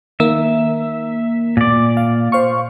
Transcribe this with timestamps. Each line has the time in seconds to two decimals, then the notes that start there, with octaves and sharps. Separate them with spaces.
0.20 D#3 A#3 E5
1.57 A#2 D5
1.97 F5
2.32 C5 F5 C#6